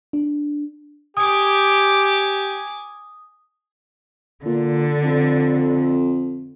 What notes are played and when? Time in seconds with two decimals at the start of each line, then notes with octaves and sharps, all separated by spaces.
0.13 D4
1.17 G4 G#5 D6 D#6
4.45 A#2 D3
5.03 F2